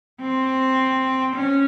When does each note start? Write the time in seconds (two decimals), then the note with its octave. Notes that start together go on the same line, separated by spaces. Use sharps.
0.21 C4
1.36 C#4